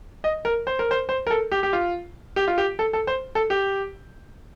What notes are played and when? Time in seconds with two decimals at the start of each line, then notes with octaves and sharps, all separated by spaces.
0.24 D#5
0.45 A#4
0.67 C5
0.79 A#4
0.91 C5
1.09 C5
1.27 A#4
1.30 A4
1.52 G4
1.63 G4
1.73 F4
2.36 G4
2.48 F4
2.58 G4
2.79 A4
2.93 A4
3.07 C5
3.35 A4
3.50 G4